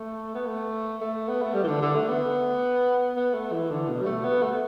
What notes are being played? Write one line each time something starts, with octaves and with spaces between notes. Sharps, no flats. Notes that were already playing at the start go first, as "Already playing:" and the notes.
Already playing: A3
B3
A3
A3
B3
A3
G3
E3
D3
D3
A3
B3
B3
A3
E3
D3
B2
G3
A3
B3
A3